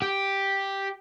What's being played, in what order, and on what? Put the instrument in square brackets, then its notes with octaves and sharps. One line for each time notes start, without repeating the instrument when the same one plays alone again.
[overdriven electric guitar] G4